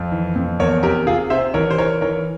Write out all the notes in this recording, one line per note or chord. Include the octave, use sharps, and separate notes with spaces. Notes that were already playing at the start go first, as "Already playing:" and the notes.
Already playing: F2
E3
F2
E2 A#4 C#5
C3 G4 A#4
C3 F4 G#4
C3 C5 E5
E3 A#4 C#5
C5
E3 A#4 C#5
E3 A#4 C#5